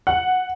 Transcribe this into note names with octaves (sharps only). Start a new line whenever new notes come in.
F#5